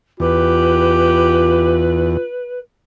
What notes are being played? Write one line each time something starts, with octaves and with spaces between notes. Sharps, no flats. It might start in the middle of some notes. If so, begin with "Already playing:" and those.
E2 F4 G4 B4